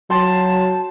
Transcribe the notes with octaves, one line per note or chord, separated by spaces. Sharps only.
F#3 G5 A5 C6